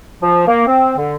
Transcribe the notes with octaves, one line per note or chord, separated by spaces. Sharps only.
F3
A#3
C4
D3